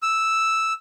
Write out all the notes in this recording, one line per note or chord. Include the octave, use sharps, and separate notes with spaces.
E6